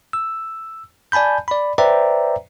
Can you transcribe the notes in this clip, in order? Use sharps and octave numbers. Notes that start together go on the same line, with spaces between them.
E6
D5 G#5 A5 B5 G6
D5 B5
B4 C5 D5 E5 G5 A#5